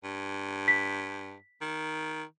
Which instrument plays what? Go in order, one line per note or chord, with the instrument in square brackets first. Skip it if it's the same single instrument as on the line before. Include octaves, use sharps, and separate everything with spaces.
[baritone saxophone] G2
[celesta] B6
[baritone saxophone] D#3